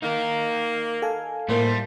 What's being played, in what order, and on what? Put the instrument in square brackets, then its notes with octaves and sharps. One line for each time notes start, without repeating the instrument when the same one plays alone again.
[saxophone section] A#3 [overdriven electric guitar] D#4 A#4
[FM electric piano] A4 F5 G#5
[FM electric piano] A2 A#3 [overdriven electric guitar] G3 [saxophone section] A3 F4 C5